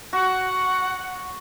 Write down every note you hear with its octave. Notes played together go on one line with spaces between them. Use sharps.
F#4 F#5